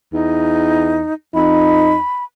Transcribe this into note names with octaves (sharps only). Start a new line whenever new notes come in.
E2 D#4
F2 D#4 B5